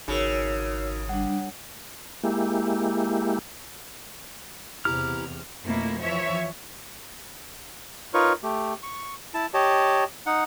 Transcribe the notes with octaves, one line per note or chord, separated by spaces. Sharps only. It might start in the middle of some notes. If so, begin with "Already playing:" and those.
G#1 C#3 D#4 F#4 A#4 C#5 E6
G3 D4 F#5
G#3 A#3 E4 G4
E2 C3 E4 G4 A#5 F6
F2 B2 A3 A#3 E4
E3 F3 C#5 E5
D#4 F4 A#4 B4 C#5 C#6
A3 G4
C#6
E4 A5
G4 C#5 D#5 A5
D#4 F#5